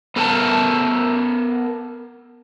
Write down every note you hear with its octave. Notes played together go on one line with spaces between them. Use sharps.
B3 A4 A#4 G#5 A5